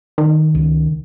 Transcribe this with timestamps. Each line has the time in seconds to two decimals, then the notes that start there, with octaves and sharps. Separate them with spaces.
0.18 D#3
0.55 C#2